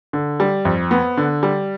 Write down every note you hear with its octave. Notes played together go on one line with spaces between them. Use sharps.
D3
G3
F2
B3
D3
G3